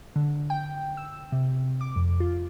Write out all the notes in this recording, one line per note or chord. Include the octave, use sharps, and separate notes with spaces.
D3
G5
E6
C3
D6
F2
F4